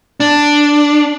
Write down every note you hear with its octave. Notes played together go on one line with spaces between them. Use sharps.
D4